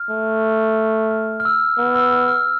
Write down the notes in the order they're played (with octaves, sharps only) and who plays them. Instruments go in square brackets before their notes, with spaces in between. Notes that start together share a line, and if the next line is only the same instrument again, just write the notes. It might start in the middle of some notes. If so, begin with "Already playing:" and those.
Already playing: [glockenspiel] F6
[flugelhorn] A3
[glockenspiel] F6
F6
E6
[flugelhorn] B3
[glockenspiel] E6
F6
F6